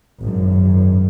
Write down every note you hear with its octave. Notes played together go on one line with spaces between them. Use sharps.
G#1 F#2